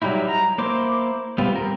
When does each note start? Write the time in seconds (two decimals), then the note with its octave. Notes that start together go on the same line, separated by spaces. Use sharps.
0.02 F#3 G3 D#4 E4
0.28 A#5
0.58 A#3 E4 C5 D6
1.38 G3 B3 C4 F4
1.56 C4 A#4